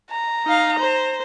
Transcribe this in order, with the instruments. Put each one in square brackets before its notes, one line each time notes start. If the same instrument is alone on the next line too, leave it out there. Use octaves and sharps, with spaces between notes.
[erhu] A#5
[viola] D#4 F5
C5